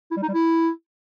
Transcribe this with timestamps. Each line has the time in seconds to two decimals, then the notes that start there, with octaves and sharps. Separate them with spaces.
0.11 E4
0.17 G3
0.23 D#4
0.28 G3
0.34 E4